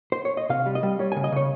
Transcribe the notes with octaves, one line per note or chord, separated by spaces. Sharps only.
C5
C#5
D#5
C3 F5
G3
D#5
G3
G3 C#5
G#5
C#3
D#5
C#3 C#5